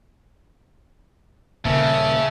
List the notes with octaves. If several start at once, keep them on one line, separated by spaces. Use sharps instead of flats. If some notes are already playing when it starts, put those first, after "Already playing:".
D#1 C#3 A#3 E5 A5